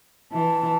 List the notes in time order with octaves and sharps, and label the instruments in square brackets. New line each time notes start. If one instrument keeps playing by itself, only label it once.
[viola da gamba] E3 [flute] A5